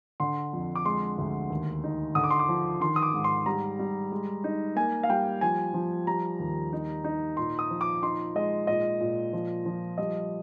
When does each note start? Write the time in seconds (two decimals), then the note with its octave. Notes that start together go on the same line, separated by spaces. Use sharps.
0.20 D3 C6
0.53 F2
0.75 D6
0.86 G#3 C6
1.18 D2
1.50 D#2
1.84 D#4
2.15 D3 D#6
2.24 D6
2.31 C6
2.39 D6
2.49 F3
2.80 D#3 C6
2.96 D#6
3.02 D6
3.14 G#2
3.24 C6
3.46 G3 A#5
3.79 G3
4.12 G#3
4.44 D#4
4.76 A#3 G#5
5.03 F5
5.09 G3 G5
5.41 F3 G#5
5.74 F3
6.07 G3 A#5
6.39 D#2
6.73 D#4
7.04 D#4
7.37 A#2 C6
7.59 D#6
7.70 F3
7.81 D6
8.02 D#4 C6
8.35 G#3 D#5
8.67 A#2 D#5
9.01 A#2
9.33 F3
9.66 F3
9.98 G3 D#5